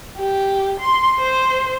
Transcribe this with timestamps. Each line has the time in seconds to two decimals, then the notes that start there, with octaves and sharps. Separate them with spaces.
0.17 G4
0.80 C6
1.20 C5